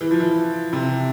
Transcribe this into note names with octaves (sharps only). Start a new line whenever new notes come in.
E3
F3
E3
C3